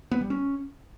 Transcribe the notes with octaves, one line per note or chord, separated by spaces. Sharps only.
B3
G3
C#4